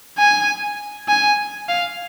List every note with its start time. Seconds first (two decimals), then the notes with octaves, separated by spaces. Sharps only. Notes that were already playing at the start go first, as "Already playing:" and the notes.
0.18 G#5
1.09 G#5
1.69 F5